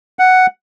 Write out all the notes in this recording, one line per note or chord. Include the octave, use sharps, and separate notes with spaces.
F#5